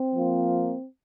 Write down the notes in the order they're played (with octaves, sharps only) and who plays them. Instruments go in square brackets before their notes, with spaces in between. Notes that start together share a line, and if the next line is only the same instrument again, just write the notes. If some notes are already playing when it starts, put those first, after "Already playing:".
Already playing: [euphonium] C4
[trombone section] F3 A#3 F4